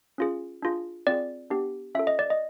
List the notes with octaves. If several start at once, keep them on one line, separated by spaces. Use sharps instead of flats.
C#4 F4 G#4
D4 F4 G#4
C4 F4 G#4 D5
B3 D4 G4
C#4 F4 A4 E5
D#5
D5
D#5